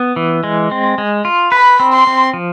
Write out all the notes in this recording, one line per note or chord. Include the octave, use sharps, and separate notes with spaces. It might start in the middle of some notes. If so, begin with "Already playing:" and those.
Already playing: B3
E3
G#3
C4
G#3
F4
B4 B5
C4
C6
C4
F3